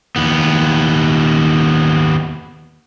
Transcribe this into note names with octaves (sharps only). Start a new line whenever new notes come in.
D#2 B3